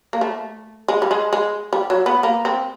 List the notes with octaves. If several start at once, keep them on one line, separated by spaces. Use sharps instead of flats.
A#3
A3
G#3
G3
G#3
G#3
G3
F#3
B3
A#3
C4